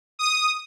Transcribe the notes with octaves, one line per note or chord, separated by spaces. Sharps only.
D#6